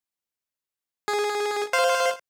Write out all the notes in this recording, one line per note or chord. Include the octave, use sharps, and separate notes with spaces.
G#4
C5 F5